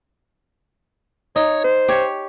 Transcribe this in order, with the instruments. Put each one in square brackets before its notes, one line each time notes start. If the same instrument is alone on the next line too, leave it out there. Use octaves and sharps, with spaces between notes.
[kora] D#4 [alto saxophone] C#5
[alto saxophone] C5
[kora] G4 C#5